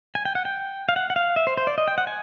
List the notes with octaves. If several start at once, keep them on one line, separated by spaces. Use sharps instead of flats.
G#5
G5
F#5
G5
F5
F#5
F#5
F5
E5
C5
C5
D5
D#5
G5
F#5
G#5